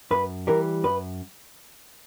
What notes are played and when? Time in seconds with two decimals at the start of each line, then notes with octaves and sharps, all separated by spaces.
0.11 F#2 B4
0.47 E3 G3 A#4
0.84 F#2 B4